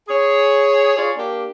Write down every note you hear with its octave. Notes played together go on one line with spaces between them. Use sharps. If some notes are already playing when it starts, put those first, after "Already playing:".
G#4 C#5
F4 G#4 C#5 D5
A#3 D4 G4